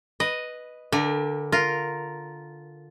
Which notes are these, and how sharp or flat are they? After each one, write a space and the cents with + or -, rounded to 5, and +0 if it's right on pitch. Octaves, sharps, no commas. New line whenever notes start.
B4 +0 D#5 +0
D3 +0 A#4 +30 G#5 -40
F4 +0 A#4 +0